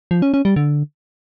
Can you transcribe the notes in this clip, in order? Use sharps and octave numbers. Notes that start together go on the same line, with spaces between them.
F3
C#4
C#4
G3
D3